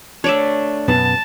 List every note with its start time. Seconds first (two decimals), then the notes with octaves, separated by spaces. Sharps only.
0.24 A3 D4 C#5 D5 E5
0.88 F#2 B2 B3 A5